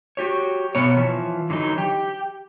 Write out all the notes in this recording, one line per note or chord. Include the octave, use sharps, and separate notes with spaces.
F#4 G4 C#5
B2 B3 C#5
E3 F3
D3 E3 F#3 D#4
G4